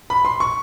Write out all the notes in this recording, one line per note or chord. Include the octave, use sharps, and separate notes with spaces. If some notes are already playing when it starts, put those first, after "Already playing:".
B5
C6
C#6